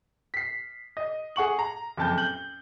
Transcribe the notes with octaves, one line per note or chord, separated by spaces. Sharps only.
B6 C7
D#5
G#4 F#5 C#6 F#7
A#5
F#1 F2 A5 G6
G6 F#7